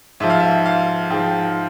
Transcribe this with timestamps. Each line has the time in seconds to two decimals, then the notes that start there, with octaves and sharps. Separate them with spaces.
0.20 G#2 F3 E5
0.30 F5
0.40 E5
0.66 F5
1.10 G#2 F3 G5